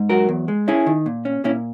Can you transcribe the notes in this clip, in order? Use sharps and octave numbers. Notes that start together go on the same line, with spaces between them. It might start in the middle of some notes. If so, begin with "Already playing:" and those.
Already playing: G#2
F#3 F#4 A#4
E2
G#3
C#4 E4 G#4
D#3
A#2
C#4
A#2 C#4 E4